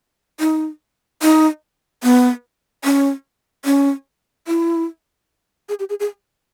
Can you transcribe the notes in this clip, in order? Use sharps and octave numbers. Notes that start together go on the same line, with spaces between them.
D#4
D#4
B3
C#4
C#4
E4
G#4
G4
G#4
G#4